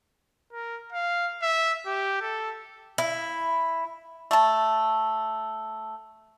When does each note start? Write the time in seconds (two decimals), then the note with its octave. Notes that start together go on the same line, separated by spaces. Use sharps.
0.53 A#4
0.92 F5
1.42 E5
1.86 G4
2.21 A4
2.98 E4
4.31 A3 A5